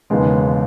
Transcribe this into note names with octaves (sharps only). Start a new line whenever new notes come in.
E1 D#2 C#3 G#3 B3